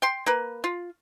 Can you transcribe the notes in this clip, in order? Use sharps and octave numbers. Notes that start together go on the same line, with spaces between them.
G5 C6
A#3 B4
F4